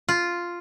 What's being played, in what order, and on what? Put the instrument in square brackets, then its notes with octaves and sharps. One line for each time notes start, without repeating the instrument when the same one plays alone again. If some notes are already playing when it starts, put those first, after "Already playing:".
[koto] F4